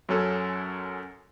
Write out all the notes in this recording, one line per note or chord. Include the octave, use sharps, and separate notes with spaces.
F#2 F#3 C#4 A4